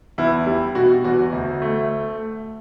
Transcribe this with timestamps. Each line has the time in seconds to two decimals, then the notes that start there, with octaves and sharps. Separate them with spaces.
0.18 E2 E4
0.46 G3 E4
0.75 B2 F#4
1.04 E2 F#4
1.33 D2
1.62 A3